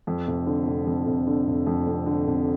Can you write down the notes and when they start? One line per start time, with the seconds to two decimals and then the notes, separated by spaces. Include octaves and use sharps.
0.07 F2
0.27 F1
0.46 D3
0.66 F1
0.87 F2
1.06 F1
1.27 D3
1.47 F1
1.66 F2
1.87 F1
2.06 D3
2.27 F1